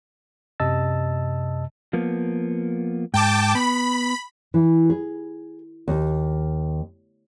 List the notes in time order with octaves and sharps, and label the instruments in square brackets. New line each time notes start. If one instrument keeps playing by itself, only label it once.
[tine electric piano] F#2 C3 D#5 A5 E6 A6
[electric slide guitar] F3 A#3 B3
[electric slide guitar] G#2 [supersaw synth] G5 A5 D6
[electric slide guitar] B3 [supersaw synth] B5
[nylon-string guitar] E3
G#4
D#2